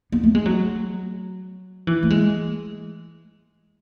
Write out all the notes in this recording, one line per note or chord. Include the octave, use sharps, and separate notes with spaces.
B3
A3
G#3
F#3
E3
A3
G#3